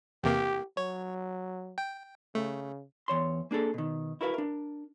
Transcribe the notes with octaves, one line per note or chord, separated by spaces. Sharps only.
E2 C3 A#3 G4
F#3 C#5
G5
C#3 A3
E2 C#5 C6
A#3 D4 G#4 A4
B2 D#3
E4 F#4 A#4 B4 F5
D4 A#4